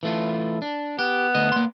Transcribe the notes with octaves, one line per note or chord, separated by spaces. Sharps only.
E3 A3 F4
D4
B3 G4
D2 D#5
A#3 C6